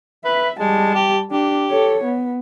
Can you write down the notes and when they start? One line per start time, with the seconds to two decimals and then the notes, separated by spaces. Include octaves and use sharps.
0.25 B4 E5
0.59 G3 G#3 A5
0.95 G4
1.31 D4 G4
1.71 A4 C#5
2.04 B3